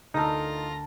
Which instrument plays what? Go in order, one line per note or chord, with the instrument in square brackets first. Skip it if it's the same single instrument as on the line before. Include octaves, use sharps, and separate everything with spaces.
[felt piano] D2 [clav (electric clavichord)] D#4 [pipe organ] F4 A#6 [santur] A4 A#4